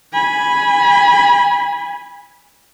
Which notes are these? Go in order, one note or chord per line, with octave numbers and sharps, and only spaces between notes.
G#5 B5